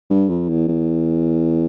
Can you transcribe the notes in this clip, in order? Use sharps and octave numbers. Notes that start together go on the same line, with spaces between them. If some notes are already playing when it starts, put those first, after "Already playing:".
G2
F2
E2
E2